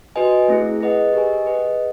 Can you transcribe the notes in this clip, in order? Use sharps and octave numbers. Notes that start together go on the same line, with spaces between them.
F#4 B4 D#5 G#5
A3 C4 E4 G#4
G#4 B4 D#5 F#5
G4 A#4 D#5 G#5
G#4 B4 D#5 F#5